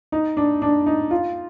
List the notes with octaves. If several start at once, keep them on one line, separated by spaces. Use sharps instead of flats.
D#4
D4
D4
D#4
F4